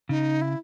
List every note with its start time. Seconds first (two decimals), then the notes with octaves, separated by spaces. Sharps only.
0.09 C#3 D#4
0.42 E4